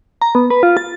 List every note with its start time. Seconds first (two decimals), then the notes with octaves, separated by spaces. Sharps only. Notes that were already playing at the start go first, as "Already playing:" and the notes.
0.22 A#5
0.35 B3
0.50 B4
0.63 F4
0.77 A6